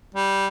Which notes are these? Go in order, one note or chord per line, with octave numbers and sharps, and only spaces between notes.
G3